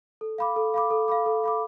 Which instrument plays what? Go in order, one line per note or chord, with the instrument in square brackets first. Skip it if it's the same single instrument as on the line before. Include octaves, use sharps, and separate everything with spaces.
[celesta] A4
F5 B5 D6
A4
F5 B5 D6
A4
F5 B5 D6
A4
F5 B5 D6